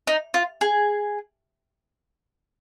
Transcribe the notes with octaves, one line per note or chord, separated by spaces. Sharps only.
D#4
F4
G#4